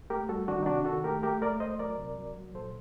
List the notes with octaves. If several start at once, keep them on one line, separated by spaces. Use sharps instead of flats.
A3 G4 A#4
G3 F#4 A4
D#3 D4 F#4
D#4
C3 D4 F#4
D#3 F#4 A4
A3 G4 A#4
A3 G4 A#4
A3 A#4 D5
A3 C5 D#5
F#3 A#4 D5
C3
F#3
F#3
A#2 A4 C5